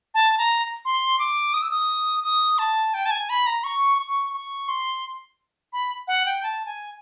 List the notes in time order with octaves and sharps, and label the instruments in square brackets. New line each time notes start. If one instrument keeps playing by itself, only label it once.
[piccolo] A5
A#5
C6
D6
D#6
E6
D#6
D#6
A5
G5
A5
G#5
B5
A#5
C#6
C#6
C#6
C6
B5
F#5
G5
A5
G#5